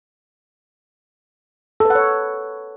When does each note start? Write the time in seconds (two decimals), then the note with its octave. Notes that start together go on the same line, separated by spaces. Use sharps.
1.80 A4
1.85 B4
1.90 F#5
1.95 C#5